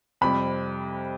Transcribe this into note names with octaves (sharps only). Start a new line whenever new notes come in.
F2 C3 G3 B5